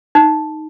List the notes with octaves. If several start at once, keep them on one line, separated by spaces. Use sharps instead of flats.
D#4